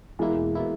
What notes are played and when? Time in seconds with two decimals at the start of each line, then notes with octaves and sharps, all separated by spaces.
0.19 E2 B2 E3 G#3 A#3 E4
0.55 B2 A#3 E4